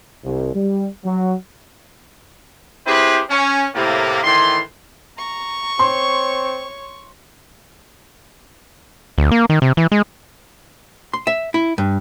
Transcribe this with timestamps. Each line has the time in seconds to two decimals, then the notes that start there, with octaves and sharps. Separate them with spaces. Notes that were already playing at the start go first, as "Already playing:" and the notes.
0.24 C2
0.54 G3
1.04 F#3
2.87 C4 E4 G4 G#4 B4 C5
3.30 C#4
3.75 A2 C3 A#3
4.24 A2 D#3 E3 C6
5.18 A#5 C#6
5.79 C4 C#5 C6
9.18 D2
9.31 A#3
9.49 D#3
9.62 C3
9.77 E3
9.92 G#3
11.13 C6
11.27 E5
11.54 E4
11.78 G2